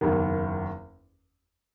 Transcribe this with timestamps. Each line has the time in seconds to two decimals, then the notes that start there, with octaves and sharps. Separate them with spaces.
0.01 F#1 E2 D#3